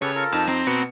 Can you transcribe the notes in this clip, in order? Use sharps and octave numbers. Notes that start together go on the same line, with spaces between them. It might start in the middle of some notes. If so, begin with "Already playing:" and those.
C#3 G4 A4 B4 C#5
F4 A4 A#4
F2 D#4 A5
C4 A#5
B2 B4 C#7